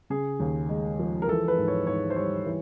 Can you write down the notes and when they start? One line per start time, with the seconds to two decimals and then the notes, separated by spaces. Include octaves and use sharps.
0.10 C#3 G#4
0.40 D#2
0.69 G#3
0.99 F3
1.22 A#4
1.29 E3 A4
1.48 B4
1.58 G#2
1.68 C#5
1.87 G#2 C#5
2.10 C5
2.16 G3 C#5
2.46 E3